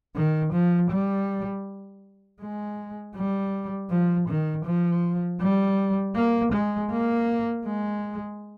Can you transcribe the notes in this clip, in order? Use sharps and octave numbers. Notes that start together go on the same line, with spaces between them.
D#3
F3
G3
G#3
G3
F3
D#3
F3
G3
A#3
G#3
A#3
G#3